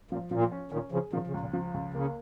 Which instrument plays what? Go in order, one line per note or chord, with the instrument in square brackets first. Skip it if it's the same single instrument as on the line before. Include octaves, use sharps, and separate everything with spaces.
[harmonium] A#2 [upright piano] F3
[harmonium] A#2 [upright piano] F3
[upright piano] C#4
[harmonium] A#2 D#3 [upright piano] C#4
[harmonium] C#3 F3 [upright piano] G#4
[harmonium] A#2 D#3 [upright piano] F3
[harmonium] C#3
[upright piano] C#2
[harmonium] A#2
[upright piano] F3
C#2
[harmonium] C#3 [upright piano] A#3